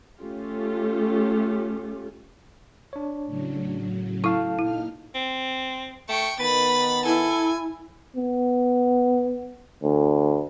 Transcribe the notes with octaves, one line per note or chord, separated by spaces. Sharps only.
A3 C#4 F4 G4
D4 C#5
A2 C#3 F#3
E4 A4 F5 A5 C#6
A#2 D#4 E4 F6
C4
A3 G5 C#6
D#3 B3 B4 B5 A6
E4 A4 G#5
B3
D2